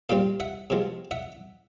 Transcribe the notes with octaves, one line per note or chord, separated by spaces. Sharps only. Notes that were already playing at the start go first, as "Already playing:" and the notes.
A#2 G3 C4 F5 G5
E5 F#5
C3 F3 G#3 B3
E5 F#5